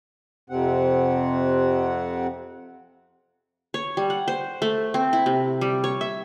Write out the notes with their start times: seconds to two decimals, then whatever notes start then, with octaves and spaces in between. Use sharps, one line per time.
0.50 F2 C3 C4 F#5
3.74 C#5
3.97 G3
4.10 F#5
4.28 C5
4.62 A3
4.94 C4
5.13 E4
5.26 C3
5.61 G3
5.84 C#5
6.01 E5